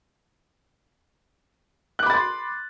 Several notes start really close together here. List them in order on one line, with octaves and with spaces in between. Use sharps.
F#6 D6 B5 A6 C6